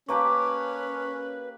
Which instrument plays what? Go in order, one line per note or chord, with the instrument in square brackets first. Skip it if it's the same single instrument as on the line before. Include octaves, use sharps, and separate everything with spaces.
[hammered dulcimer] A#3 G4 D6 [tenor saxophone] C#4 [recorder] B4 [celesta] A5 A#5 C#6